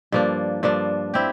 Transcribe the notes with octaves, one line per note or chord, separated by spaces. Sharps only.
G2 F3 A#3 D4
G2 F3 A#3 D4
C4 E4 G4